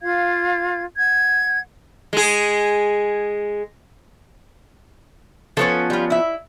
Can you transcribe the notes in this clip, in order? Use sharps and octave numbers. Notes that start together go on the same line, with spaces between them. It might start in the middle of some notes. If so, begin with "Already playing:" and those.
F4 F5 G#6
F#5 G#6
G#3 G#4
F3 B3 C#4 A4 C#5
G3 F4
E4 E5